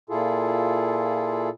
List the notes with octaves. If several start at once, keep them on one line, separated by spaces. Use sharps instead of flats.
A#2 E4 F4 G#4 A4